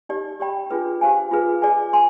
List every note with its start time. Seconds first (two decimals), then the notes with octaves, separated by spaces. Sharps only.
0.09 D#4 G4 D5
0.40 G4 D5 G5 B5
0.70 D4 F4 G#4 B4
1.01 G4 C5 F5 G#5
1.31 F4 G#4 B4
1.62 G#4 D5 G#5
1.93 G#5 C6